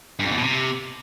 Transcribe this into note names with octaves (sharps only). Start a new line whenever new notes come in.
G2
F2
E2
B2
C3